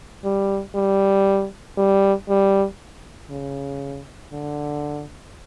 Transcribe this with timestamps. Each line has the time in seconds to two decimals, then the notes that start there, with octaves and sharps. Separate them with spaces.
0.24 G3
0.75 G3
1.78 G3
2.29 G3
3.30 C#3
4.32 D3